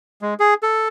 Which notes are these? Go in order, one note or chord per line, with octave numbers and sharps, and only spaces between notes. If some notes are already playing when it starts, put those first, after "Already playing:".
G#3
G#4
A4